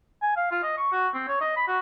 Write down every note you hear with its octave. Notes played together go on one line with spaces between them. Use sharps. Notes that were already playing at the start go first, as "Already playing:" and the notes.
G#5
F5
F4
D#5
C#6
F#4
C4
C#5
D#5
B5
F#4